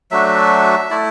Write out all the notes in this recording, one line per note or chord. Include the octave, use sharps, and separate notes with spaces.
F#3 A3 D4 F#4 E5
A3 E4 D5